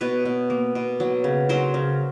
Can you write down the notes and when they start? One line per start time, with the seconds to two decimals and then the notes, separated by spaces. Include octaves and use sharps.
0.01 B2 B4 C#5
0.25 B2
0.50 A#3
0.75 B2
1.00 F#3
1.24 C#3
1.49 F#3 A#4 C5
1.74 C#3